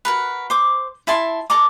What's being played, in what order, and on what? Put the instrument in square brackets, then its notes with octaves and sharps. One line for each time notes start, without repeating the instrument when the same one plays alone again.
[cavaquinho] F#4 A#4 B4
C5 D6
E4 E5 A5 C6
A4 D5 A#5 D6